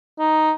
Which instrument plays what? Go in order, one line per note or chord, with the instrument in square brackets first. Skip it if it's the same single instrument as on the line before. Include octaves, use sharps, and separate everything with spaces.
[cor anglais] D#4